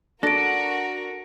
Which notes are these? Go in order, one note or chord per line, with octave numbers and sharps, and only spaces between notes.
D4 F#4 A4 A#4 A#6 D7